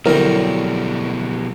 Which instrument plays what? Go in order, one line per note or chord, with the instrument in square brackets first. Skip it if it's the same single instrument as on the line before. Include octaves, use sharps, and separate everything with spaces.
[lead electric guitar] B2 G3 [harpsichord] D3 C4 [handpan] F#3 E4 F#4 [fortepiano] A#4